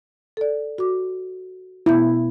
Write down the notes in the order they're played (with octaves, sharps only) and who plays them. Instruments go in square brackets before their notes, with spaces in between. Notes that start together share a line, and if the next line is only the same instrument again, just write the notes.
[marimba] A4 D5
F#4 D6
[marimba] B2 B3 G6 [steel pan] E4